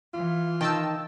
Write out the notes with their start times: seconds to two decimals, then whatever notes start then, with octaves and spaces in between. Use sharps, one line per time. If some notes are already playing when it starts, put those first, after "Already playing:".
0.14 E3 F4
0.61 D#3 G5 A5 E6